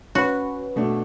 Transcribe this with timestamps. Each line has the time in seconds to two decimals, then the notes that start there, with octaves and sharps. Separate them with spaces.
0.15 C#4 F#4 B4
0.76 B2 A3 D4